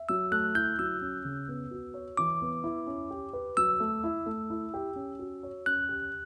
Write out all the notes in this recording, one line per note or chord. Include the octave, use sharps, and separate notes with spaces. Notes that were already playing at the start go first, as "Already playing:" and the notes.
Already playing: E5
F#3 E6
A3 F#6
E4 G6
F#3 E6
C#4
C#3
B3
F#4
C#5
E3 D6
B3
E4
C#4
G4
B4
F#3 E6
A3
E4
A3
E4
G4
C#4
F#4
C#5
C#4 F#6
G4